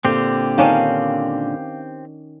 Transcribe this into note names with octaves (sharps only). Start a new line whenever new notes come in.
A#2 D3 C4 G4
D#3 C#4 D4 F5